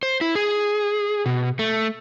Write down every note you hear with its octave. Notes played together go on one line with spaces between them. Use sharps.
C5
E4
G#4
B2
A3